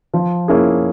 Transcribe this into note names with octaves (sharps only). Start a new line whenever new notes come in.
F3
A#3 C#4 E4 G#4